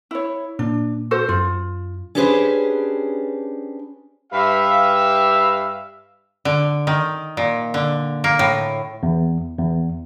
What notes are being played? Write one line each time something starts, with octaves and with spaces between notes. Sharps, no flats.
E4 C#5
A#2 D4
F#4 A4 C5
F#2 F4
C#4 D4 G4 G#4 B4 C5
G2 G4 B4 E5 F5
D3
D#3
A#2
D3
A#3
A2
E2
E2